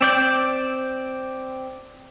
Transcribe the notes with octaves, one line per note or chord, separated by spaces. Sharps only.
C4 D5 G6